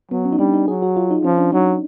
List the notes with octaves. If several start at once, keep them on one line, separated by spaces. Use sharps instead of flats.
F#3 B3
C#4
D#4
G3 D4
D#4
F#3 G#4
F#4
F4
D#4
F3 C#4
D4
F#3 D#4